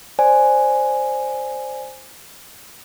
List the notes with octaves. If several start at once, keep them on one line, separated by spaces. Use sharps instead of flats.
C5 D5 G#5